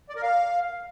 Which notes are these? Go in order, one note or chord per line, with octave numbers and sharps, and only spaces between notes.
D5
A#4
F5